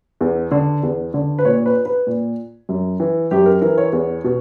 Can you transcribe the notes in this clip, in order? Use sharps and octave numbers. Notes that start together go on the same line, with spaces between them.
E2
D3
E2
D3
B4
A#2 C#5
B4
B4
A#2
F#2
E3
F#2 G4
A#4
E3 A#4
C#5
E2
B2